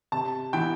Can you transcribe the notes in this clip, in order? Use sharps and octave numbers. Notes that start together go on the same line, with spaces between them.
C3 A5
E3 B3 E4 G5